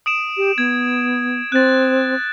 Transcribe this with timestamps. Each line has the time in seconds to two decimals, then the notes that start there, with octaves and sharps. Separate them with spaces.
0.06 D#6 D7 E7
0.37 G4
0.58 B3 G#6
1.52 C4 F#6 A6